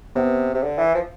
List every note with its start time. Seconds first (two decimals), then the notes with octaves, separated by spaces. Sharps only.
0.15 C3 B3
0.54 C3
0.63 D3
0.78 E3
0.95 F3